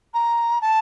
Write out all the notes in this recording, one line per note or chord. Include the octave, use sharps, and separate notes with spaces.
A#5
A5